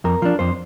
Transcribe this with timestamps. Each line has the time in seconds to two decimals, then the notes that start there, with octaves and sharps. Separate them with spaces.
0.04 F2 A#4
0.22 F3 D4
0.39 F2 C5